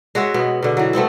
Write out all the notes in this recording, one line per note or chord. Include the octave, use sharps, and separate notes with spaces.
G#3 F#4 C#5 E5
B2 B3
B2 D3
E3 F#3
A3 B3 C4 E4